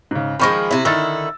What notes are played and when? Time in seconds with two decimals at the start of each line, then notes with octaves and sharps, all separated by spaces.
0.11 G#2 C#3
0.40 D#3 F3 G#3 B5 C#6 A#6
0.71 C3 E4
0.85 D3 D#3 E4 E6 A6